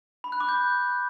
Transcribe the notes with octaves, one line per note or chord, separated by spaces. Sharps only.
B5
F#6
D6
G6